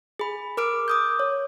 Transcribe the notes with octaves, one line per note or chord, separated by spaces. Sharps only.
G#4 B5
A#4 D6 F6 D7
D6 D#6 G6
C#5